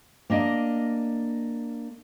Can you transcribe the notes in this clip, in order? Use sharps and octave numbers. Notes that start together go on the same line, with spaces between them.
A#3 D4 D#5